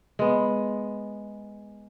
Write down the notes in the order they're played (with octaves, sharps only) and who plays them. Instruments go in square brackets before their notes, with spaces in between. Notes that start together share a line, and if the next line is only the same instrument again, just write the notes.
[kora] G#3 B3